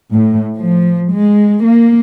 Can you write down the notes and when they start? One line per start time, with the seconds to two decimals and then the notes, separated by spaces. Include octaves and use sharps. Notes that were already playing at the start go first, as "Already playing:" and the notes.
0.13 A2
0.57 F3
1.12 G#3
1.66 A#3